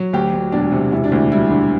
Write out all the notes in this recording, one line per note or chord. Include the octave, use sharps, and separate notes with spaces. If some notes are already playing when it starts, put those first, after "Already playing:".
Already playing: F#3
D2 G4
D2
E1 D4
C3
E1 E4
D4
D2 E4
G3 E4
D3